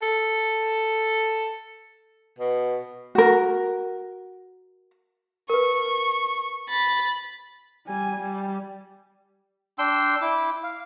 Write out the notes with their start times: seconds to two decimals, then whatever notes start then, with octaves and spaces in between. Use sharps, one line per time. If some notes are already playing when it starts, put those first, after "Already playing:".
0.02 A4
2.38 B2
3.15 F#4 A#4
5.50 A#4 B4 C#6
6.69 B5 A6
7.87 G3 G#5
8.20 G3
9.78 D4 G5 C6 E6
10.21 E4 D6
10.63 F5